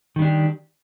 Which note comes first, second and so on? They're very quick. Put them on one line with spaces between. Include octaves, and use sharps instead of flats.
D#3 G3 D4 G4